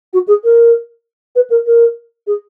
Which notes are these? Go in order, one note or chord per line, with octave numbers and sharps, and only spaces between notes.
F#4
G#4
A#4
B4
A#4
A#4
G#4